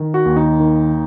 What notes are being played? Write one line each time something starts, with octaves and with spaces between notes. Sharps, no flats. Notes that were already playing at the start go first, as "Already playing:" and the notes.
Already playing: D#3
F#4
D#2
D#4
D#3